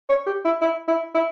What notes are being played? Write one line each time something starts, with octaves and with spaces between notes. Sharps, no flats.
C#5
G4
E4
E4
E4
E4